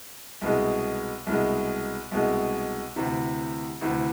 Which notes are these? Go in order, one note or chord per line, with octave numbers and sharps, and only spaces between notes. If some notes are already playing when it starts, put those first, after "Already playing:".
C2 B2 G#3
C2 B2 G#3
C2 B2 G#3
D2 C3 E3
D2 C3 E3